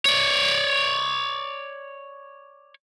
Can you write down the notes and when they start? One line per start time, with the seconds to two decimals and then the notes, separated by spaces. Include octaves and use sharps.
0.05 C#5 D5